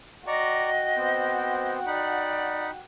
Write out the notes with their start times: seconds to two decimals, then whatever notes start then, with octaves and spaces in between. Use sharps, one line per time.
0.27 F#4 D5 D#5 G5 A#5 C#6
0.96 B3 C4 C5
1.87 D#4 D5 F#5 B5